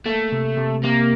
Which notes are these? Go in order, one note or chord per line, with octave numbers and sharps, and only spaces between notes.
A3 A#3
C3
C3
C3 A#3